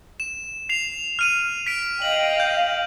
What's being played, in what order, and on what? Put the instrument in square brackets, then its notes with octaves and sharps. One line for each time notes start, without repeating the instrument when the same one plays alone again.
[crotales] E7
C7 F7
F6 D#7 F7
B6 D7
[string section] D#5 F5 G5 [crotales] F#7
[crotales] G6